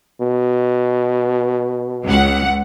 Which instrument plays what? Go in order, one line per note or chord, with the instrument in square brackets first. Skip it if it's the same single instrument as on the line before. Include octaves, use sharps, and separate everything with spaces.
[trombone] B2
[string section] C#2 F#5